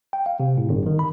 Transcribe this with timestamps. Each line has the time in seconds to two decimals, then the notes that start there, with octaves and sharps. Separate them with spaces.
0.13 G5
0.26 F5
0.40 C3
0.58 A2
0.69 G1
0.86 D#3
0.99 B5